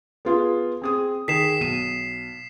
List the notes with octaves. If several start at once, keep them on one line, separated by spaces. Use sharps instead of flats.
B3 F4 G#4
C4 G#4 D#6
D#3 G#4 B6 C7 E7
B1 D#7